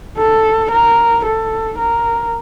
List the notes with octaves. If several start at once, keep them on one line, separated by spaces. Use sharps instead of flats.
A4
A#4
A4
A#4